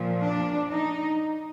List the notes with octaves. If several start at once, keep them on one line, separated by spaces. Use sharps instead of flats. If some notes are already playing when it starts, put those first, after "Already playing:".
Already playing: A#2 F3
D4
D#4